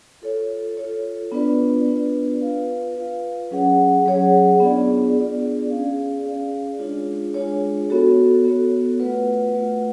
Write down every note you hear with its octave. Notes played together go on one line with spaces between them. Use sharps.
F4 A4 C#5
F4 A4 C#5
B3 D4 F4 B4 D5
B3 D4 F4 B4 D5
F4 B4 F5
F4 B4 F5
F#3 C#4 G#4 C#5 F#5
F#3 C#4 G#4 C#5 F#5
B3 D4 F4 G#4 D5
B3 D4 F4 G#4 D5
C#4 G#4 D5 F5
C#4 G#4 D5 F5
G#3 D4 F4 G#4 C#5
G#3 D4 F4 G#4 C#5
B3 F#4 A4 C#5
B3 F#4 A4 C#5
A3 F4 B4 F#5
A3 F4 B4 F#5